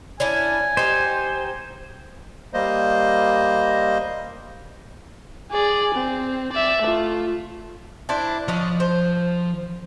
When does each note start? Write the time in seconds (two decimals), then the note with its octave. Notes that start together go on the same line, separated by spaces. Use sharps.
0.20 C#4 D4 E4 G#5
0.77 D#4 G4 C5
2.54 G3 A#3 C5 D#5
5.52 G#4 D5
5.94 C4
6.52 D5 E5
6.82 A3 F4
8.09 D4 E4 C5
8.48 F3 C#4 D4 D#5 C6
8.80 C5